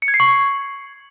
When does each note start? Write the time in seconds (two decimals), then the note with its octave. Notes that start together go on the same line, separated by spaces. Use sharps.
0.02 C#7
0.08 G#6
0.14 C7
0.20 C#6